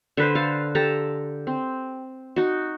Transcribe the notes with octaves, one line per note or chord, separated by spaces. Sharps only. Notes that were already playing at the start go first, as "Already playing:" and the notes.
D3 B4 C5
A4 F5
G4 A4 A5 A#5
C4
D#4 F#4